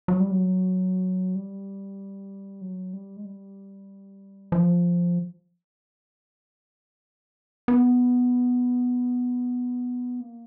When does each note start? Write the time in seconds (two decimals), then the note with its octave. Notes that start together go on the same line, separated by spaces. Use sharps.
0.08 F#3
0.20 G3
0.31 F#3
1.35 G3
2.61 F#3
2.93 G3
3.17 G#3
3.25 G3
4.52 F3
7.68 B3
10.21 A#3